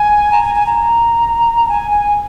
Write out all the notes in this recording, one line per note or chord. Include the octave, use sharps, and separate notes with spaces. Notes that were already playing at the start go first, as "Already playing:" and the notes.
Already playing: G#5
A#5
G#5
G#5
A#5
G#5
G#5